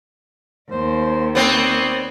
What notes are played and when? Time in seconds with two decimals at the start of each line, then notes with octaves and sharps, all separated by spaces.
0.71 D#2 C5
1.35 B3 C4 C#5 D5 D#6